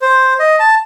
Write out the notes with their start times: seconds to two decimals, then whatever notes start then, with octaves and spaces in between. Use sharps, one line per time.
0.02 C5
0.39 D#5
0.59 A5